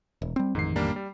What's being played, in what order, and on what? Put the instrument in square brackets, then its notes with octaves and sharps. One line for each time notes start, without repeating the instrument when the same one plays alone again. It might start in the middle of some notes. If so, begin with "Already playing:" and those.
[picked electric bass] E1
G3 C4
[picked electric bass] A1 F2 D#3 [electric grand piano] G#2 C7
[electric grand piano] G3 A#3 D4
G3